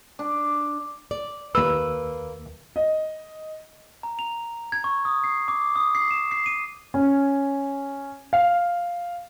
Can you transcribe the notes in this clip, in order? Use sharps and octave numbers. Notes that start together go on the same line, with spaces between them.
D4
D5
D#2 A#3 B4 E6
D#5
A#5
F7
G#6
C#6
D#6
C7
D6
D#6
C7
E7
C7
D#7
C#4
F5